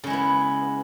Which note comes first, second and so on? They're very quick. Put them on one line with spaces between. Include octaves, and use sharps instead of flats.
C#3 G#3 E4 B3